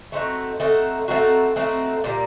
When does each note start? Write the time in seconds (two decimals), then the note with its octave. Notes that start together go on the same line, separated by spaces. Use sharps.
0.12 A3 C4 D#4 F#4
0.60 A3 C4 D#4 F#4
1.08 A3 C4 D#4 F#4
1.56 A3 C4 D#4 F#4
2.04 A#2 G3 A#3